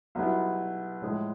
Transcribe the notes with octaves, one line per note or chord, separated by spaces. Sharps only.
B1 B2 G3 B3 E4
A2 F3 G#3